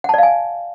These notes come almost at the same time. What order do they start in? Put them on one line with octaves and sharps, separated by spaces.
F#5 A5 D5 F5 G#5